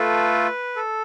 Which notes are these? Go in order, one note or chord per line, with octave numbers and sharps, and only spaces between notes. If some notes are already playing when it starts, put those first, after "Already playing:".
Already playing: A3 F4 A4 B4
A4